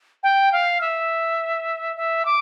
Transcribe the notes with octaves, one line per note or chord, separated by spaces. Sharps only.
G5
F5
E5
E5
D6